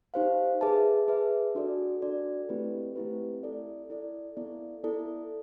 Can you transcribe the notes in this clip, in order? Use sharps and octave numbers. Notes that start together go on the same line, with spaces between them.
D#4 G4 C5 F5
G#4 B4 E5 A5
G#4 B4 E5 A5
D4 F#4 A4 D5
D4 F#4 A4 D5
A3 C4 E4 G4 B4
A3 C4 E4 G4 B4
E4 A4 D5
E4 A4 D5
B3 E4 A4 D5
B3 E4 A4 D5